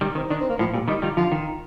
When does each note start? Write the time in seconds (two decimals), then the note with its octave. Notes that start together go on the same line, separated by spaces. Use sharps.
0.01 D#3 G3
0.15 D#3 C4
0.30 D#3 D4
0.40 C4
0.49 A#3
0.59 A2 F3
0.73 A#2 G3
0.88 D#3 G3 D#4
1.02 D#3 G3 F4
1.17 D3 F3 F4
1.32 D#3